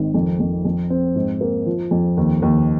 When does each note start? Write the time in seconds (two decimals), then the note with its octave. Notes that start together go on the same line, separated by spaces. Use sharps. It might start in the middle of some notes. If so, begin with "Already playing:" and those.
Already playing: G#1 D#3
0.14 F2
0.40 F2
0.65 F2
0.90 C4
1.15 G#2
1.41 A#3
1.66 F3
1.91 F2
2.17 D#2
2.42 D#2